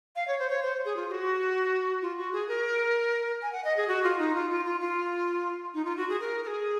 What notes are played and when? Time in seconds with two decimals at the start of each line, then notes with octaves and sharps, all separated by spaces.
0.16 F5
0.28 C#5
0.39 C5
0.50 C#5
0.63 C5
0.85 G#4
0.96 F4
1.08 G#4
1.12 F#4
2.02 F4
2.18 F#4
2.33 G#4
2.49 A#4
3.42 G#5
3.52 F#5
3.64 D#5
3.77 G#4
3.88 F#4
4.04 F4
4.19 D#4
4.35 F4
4.50 F4
4.65 F4
4.81 F4
5.74 D#4
5.85 F4
5.97 F#4
6.09 G#4
6.20 A#4
6.44 A#4
6.47 G#4